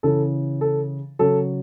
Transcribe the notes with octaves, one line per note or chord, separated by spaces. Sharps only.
C#3 E3 A4
A4
C#3 F#3 A4